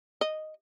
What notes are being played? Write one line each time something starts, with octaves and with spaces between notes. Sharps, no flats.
D#5